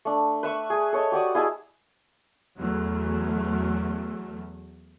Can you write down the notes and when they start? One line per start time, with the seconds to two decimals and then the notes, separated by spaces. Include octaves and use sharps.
0.05 A3 D4
0.43 B4 E5 C#6
0.70 G#4
0.93 A4 C#5 D#5
1.12 F#4 G4 D5 D#6
1.35 E4 G#4 D#5 A5
2.58 E2 F#3 A3